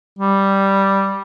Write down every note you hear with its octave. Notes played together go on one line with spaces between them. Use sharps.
G3